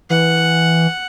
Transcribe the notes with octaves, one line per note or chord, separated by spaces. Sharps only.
E3 F#5